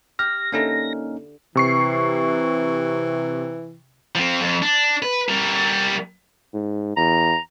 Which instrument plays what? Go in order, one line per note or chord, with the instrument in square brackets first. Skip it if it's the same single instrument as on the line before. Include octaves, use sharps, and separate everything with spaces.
[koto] G4 [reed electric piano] F6 [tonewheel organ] A#6
[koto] D3 E4 [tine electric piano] A#3 C#4 D#4
[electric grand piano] C3 C#6 C7 [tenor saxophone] E3
[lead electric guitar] F3 C4
F2
D4
B4
G3 A#4
[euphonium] G#2
[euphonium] E2 [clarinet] A#5